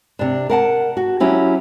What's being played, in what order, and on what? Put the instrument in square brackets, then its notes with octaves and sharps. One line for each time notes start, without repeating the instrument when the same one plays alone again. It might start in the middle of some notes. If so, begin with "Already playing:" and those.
[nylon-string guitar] C3 D4
A#4 F#5 A5
F#4
F#3 C#4 E4 G4